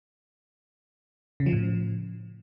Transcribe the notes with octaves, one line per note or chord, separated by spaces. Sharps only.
C#3
F3
A2